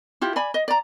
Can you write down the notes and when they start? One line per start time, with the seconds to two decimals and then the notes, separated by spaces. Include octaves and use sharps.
0.21 E4 F4 G4
0.36 D5 G#5 B5
0.54 D#5
0.68 D5 A#5